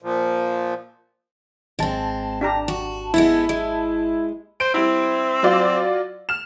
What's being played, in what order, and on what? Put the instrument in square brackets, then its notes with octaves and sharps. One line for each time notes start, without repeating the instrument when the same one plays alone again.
[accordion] A#2 F3
[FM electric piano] G#1 A5 [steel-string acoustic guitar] G#3 C4
[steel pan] D4 G4 A#5
[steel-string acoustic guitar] F#4
[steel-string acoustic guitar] G#3 B3 A4 [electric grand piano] E4
[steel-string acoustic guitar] G#3
[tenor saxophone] C5 [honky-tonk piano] D7
[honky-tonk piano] G3 E4 [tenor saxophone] C4
[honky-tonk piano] F#3 F4 D5
F6 E7